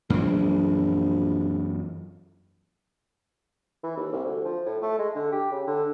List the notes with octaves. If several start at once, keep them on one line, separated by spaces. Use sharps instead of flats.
A#1 F#2 E3 G#3
E3
D#2
C2
D2
F3
A2
A3
G#3
D3
G4
C#3
D3